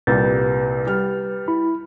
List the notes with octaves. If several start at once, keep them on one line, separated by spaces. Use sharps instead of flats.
C2 A#2 G3 B4 G6 A6
G3 F6
E4 B5